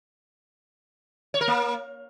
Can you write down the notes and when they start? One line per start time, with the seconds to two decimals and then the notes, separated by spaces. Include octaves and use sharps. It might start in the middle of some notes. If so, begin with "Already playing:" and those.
1.34 C#5
1.41 A#4
1.48 A#3